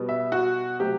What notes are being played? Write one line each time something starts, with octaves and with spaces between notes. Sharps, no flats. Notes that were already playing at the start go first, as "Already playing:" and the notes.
Already playing: B2 G3 B3
E5
F#4
C3 F#3 A3 G4